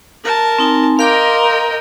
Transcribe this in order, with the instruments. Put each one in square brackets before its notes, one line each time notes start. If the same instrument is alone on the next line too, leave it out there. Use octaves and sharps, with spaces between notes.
[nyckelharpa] A#4 A5
[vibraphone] C4 D#4 G#5
[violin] A#4 D#5 [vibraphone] F5 C6 D6 [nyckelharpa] G5
[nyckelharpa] G5